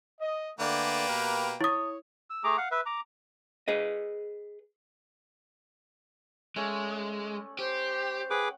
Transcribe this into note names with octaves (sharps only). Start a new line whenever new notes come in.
D#5
D3 A3 A#3 B4 D5 G5
B2 G4 A#4
E4 C#5 D#6
E6
A3 G#4 A#5 D6
F5 F#5
B4 E5
A#5 D6
G#4 B4 D#5
G#3 A3 C#4 D5
G4 C5
G#4 B4 F#5 G5 D6